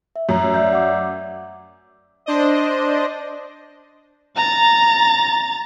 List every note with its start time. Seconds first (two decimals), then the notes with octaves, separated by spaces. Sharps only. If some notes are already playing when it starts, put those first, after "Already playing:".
0.16 E5
0.29 F#2 A3 A#5
0.54 D5 E5 G6
0.73 F#5 D6
2.26 D4 C5 D5 D#5
4.36 A#5 A6